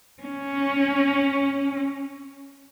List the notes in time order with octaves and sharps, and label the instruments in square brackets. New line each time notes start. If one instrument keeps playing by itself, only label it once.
[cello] C#4